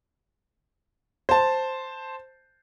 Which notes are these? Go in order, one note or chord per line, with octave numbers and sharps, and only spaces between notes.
C5 A5